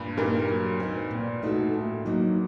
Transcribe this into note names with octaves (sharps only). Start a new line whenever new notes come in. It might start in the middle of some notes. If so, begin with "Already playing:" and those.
Already playing: G2 A#2
G2 A#2 A#3 D#4 G4 A#4
F#3
C4 D#4
A#2
A3 D#4 F#4 A4
A2
F#3 A#3 D#4